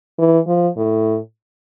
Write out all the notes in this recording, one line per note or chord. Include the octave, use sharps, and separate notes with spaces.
E3
F3
A2